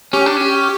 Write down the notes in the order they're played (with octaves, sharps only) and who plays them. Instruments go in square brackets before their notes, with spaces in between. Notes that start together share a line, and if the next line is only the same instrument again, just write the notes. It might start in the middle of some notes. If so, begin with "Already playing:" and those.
[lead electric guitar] C#4 [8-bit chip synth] G4
[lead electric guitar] D4
C#4